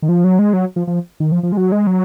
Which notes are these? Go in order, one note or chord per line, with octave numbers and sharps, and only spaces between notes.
D#3
F3
F#3
G#3
F#3
F3
F3
D#3
F3
F3
G#3
F#3
G#3
F#3